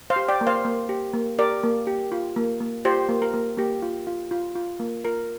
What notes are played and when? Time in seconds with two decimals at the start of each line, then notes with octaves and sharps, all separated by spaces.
0.10 C5 F5
0.16 G4
0.28 D5 G5
0.41 A#3
0.47 C5 F5
0.65 A#3
0.89 G4
1.13 A#3
1.39 G4 A#4 D5
1.63 A#3
1.87 G4
2.12 F4
2.36 A#3
2.60 A#3
2.85 F4 G4 C5
3.09 A#3
3.22 A#4
3.34 A#3
3.58 A#3 G4
3.82 F4
4.07 F4
4.31 F4
4.55 F4
4.80 A#3
5.04 F4 A#4